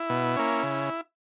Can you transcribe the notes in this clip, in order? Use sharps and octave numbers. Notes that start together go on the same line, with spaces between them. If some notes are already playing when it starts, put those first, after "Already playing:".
Already playing: E4
B2
A#3 C#4
C#3